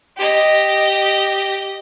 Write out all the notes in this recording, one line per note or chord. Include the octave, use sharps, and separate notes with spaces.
G4 D#5